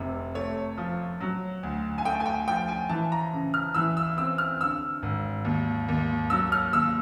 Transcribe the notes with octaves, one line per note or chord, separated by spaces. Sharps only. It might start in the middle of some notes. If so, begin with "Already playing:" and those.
Already playing: F1 C3
A3 C#5
F3
F#3
D2
G#5
A3 G5
G#5
G5
F3 G5
G#5
E3 A5
A#5
C#3
F6
E3 E6
E6
C4 E6
F6
D3 E6
G#1
D#2
D#2
F#3 E6
F6
D#2 E6